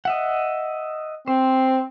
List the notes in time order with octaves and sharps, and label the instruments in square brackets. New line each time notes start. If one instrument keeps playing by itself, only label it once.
[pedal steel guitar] D#5 E5 F#5
[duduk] C4 [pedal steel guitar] C5